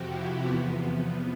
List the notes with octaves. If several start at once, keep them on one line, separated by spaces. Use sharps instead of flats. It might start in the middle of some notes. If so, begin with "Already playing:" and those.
Already playing: F2 C3 F3 F#4 G4
E4
E2 C3 F3 B3